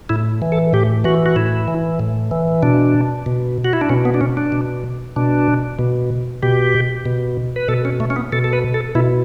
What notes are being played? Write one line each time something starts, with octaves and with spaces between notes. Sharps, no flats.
A2 E4
E3
A4
A2 G4
E3 F#4
F#4
A2 E4
E3
A2
E3
B2 D4
B2
F#4
E4
D4
B2 C#4
B3
D4
C#4
D4
B2
B2 D4
B2
B2 G4
B2
B4
B2 A4
C#4
A3
C#4
B3
B2 A4
A4
B4
A4
B2 E4